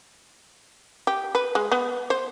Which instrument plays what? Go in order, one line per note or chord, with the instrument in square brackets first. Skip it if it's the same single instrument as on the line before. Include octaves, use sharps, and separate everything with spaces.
[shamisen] G4
B4
G#3
B3
C5